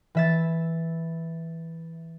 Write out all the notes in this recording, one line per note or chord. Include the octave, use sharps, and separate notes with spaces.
E3 E5 A6